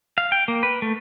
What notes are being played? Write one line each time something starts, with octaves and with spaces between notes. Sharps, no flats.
F5
G5
A#3
B4
A3